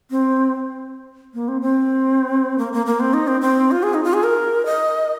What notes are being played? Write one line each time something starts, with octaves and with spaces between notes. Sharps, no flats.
C4
A#3
C4
C4
A#3
A#3
A#3
C4
D#4
C4
C4
F4
G#4
D#4
F4
G#4
A#4
D#5